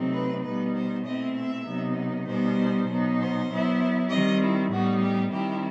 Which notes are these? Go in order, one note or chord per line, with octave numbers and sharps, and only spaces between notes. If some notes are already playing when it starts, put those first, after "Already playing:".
Already playing: C3 F#3 A3 C4 D#4
B4
B2 G3 B3 D#4 B4
C5
B2 A3 C4 E4 D#5
E5
C3 F#3 B3 D#4
B2 G3 B3 D#4 C5
B2 F#3 B3 D#4
C5
F#3 B3 E4
D#3 G3 C4 D#5
E4
A2 G3 B3 D#4 F#4
G4
D#3 G3 C4 E4 G4